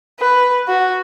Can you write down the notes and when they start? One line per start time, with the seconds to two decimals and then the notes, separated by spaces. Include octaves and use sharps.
0.20 B4
0.68 F#4